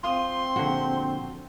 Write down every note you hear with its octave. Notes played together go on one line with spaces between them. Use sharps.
C4 F4 C6 D#6
A#1 D3 F#4